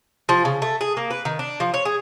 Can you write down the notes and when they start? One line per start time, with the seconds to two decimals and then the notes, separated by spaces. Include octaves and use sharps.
0.29 F3
0.45 C#3
0.62 A3
0.81 G#4
0.97 A#3
1.10 B4
1.25 D#3
1.39 D4
1.60 F3
1.74 C#5
1.85 G#4